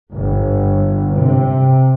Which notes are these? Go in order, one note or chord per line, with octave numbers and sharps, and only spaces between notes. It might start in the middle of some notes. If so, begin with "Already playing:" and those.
G1
C3